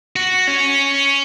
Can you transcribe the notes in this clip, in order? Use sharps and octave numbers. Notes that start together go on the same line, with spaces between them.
F#4
C#4